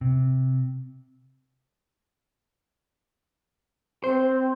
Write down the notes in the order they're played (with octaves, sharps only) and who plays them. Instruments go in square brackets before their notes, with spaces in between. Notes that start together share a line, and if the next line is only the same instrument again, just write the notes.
[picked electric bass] C3
[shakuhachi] C4 [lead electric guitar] C5